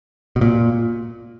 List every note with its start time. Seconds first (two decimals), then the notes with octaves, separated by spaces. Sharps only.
0.36 B2
0.41 A#2